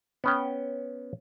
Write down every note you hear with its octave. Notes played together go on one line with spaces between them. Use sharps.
B3 C#4 G5